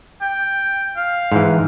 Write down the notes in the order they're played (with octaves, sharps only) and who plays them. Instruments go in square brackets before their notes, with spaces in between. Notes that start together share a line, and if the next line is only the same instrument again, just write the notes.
[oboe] G5
F5
[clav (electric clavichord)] G#2 E3